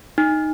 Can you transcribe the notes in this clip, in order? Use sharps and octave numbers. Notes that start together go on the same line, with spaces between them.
D#4